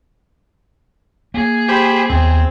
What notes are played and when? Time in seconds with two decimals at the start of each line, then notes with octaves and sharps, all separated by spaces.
1.34 A#3 G#4
1.69 G4 C5 B5
2.09 D#2 B3 C4